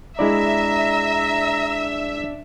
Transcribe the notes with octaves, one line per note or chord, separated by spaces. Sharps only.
G#3 D4 E4 D5 E5 A#5